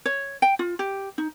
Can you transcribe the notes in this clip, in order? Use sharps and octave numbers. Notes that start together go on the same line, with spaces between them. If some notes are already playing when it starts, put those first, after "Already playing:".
C#5
G5
F4
G4
D#4